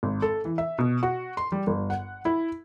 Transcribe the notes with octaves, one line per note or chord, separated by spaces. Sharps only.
G#1
A4
E3
E5
B2
F#4
C6
G3
G1
F#5
E4